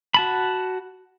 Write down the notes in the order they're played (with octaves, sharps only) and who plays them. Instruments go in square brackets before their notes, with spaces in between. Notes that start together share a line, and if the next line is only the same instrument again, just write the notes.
[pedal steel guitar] F#4 A5 B5